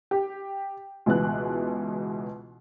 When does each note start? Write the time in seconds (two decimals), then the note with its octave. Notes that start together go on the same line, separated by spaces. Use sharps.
0.11 G4
1.06 C#2 B2 E3 B3 F#6